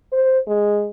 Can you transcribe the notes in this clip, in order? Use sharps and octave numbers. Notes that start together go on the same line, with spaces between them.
C5
G#3